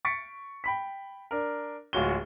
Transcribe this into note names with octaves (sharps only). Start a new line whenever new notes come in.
C#6 A6 B6 C#7 D7
G5 B5 B6
D4 A#4
D1 G#3 F4 F#4 C#5 G7